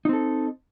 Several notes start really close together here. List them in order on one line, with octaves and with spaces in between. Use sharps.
D#4 C4 A4